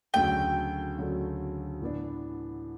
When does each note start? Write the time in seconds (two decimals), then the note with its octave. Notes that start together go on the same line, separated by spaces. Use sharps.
0.14 D2 C#3 F#3 A3 G5
0.98 D2 C#3 F#3 A3
1.81 A2 E3 B3 D4